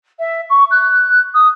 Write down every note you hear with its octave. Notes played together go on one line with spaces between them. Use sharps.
E5
C#6
F#6
D#6